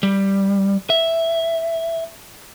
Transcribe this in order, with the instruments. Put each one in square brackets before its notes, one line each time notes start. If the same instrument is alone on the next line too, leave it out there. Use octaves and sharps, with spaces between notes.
[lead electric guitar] G3
E5